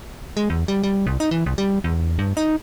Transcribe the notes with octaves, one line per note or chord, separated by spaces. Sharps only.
G#3
E2
G3
G3
C2
D#4
E3
C2
G3
E2
G2
D#4